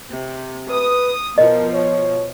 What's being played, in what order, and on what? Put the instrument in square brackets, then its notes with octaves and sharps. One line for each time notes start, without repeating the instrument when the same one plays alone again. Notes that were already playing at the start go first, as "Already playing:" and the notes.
[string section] C3
[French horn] B4 [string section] D#6
[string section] B2 F3 [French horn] A#4 [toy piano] D#5
[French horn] C#5